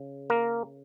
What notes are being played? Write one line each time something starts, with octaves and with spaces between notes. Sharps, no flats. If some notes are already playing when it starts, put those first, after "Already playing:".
Already playing: C#3
A#3 A#4